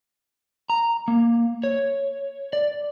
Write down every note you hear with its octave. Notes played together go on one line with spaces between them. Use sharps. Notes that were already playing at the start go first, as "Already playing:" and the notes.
A#5
A#3
C#5
D5